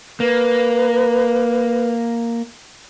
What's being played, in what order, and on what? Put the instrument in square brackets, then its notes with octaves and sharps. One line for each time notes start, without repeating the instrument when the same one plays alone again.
[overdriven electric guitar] A#3 [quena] B4